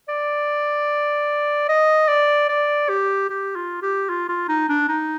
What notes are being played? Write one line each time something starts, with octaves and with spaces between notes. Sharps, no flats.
D5
D#5
D5
D5
G4
G4
F4
G4
F4
F4
D#4
D4
D#4